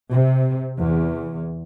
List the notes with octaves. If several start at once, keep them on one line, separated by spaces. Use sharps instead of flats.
C3
E2